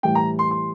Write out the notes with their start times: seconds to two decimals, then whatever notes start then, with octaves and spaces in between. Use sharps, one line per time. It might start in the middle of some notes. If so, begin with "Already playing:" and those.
0.03 A2 E3 G3 G5
0.15 A#5
0.39 C6
0.51 C6